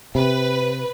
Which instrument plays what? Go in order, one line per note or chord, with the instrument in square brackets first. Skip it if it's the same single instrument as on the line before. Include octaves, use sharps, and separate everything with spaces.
[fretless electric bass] C3 [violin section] B4